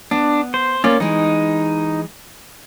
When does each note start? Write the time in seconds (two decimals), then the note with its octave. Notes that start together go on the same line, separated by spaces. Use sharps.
0.11 B3 D4
0.54 C5
0.84 A#3 C#4 F4 D5
1.00 E3 G#3 D#4